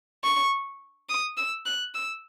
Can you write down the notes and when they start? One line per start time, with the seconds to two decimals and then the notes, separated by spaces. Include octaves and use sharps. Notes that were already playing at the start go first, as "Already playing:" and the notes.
0.24 C#6
1.09 D#6
1.37 E6
1.66 F#6
1.95 E6